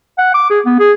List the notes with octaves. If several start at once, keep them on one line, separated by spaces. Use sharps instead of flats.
F#5
D6
G#4
B3
G#4